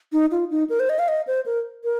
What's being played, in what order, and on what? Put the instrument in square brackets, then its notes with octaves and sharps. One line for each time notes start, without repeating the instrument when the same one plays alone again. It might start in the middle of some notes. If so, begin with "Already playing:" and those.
[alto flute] D#4
F4
D#4
A#4
C5
D#5
F5
D#5
C5
A#4
A#4